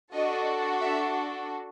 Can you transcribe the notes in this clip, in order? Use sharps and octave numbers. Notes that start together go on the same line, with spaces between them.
D4 F#4 A4 D#5
E5